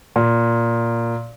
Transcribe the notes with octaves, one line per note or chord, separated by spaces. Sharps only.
A#2